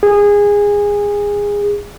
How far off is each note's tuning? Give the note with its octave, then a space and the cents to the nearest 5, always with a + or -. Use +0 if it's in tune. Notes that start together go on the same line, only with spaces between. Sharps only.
G#4 -20